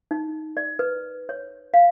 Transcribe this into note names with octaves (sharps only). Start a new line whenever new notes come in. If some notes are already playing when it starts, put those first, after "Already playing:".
D#4
D5
B4
C#5
F5